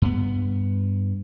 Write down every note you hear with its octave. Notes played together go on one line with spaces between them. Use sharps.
G2 B3